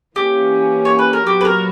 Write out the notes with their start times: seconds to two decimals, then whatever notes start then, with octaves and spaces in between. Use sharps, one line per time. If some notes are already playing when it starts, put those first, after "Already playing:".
0.16 E3 A#3 C#4 G4
0.85 C#5
0.99 B4
1.13 A#4
1.27 A#2 F#3 B3 F#4 G4
1.41 B4
1.45 A#4